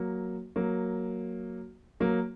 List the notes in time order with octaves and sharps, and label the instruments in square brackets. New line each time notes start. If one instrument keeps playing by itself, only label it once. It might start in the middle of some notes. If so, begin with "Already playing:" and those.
Already playing: [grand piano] F#3 A#3
F#3 A#3
F#3 A#3